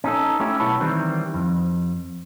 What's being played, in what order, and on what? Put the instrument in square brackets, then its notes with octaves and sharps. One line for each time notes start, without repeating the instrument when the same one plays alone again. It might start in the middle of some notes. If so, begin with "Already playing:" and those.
[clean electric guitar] C#4 D#4 A4
A3 C#4 E4 G4
B1 B3 E4 C#5 A5 B5
D#3 E3 G3 C4
F2